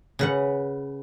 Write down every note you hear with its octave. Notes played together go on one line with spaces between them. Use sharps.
C#3 B4 F#5